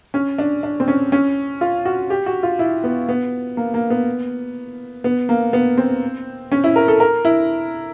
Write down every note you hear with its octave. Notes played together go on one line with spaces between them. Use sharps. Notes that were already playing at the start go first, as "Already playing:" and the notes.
C#4
D4
D4
C4
C#4
C#4
F4
F#4
G4
F#4
F4
E4
B3
B3
A#3
A#3
B3
B3
A#3
B3
C4
C#4
E4
A#4
A4
A#4
E4